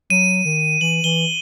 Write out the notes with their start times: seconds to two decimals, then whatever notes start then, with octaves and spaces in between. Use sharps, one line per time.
0.10 F#3 D#7
0.45 D#3
0.81 E3 F#7
1.04 E3 G7